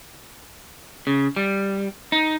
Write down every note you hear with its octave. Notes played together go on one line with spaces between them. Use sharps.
C#3
G3
D#4